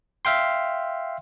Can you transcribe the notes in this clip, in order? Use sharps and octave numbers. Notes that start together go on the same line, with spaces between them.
E5 F5 G5 C6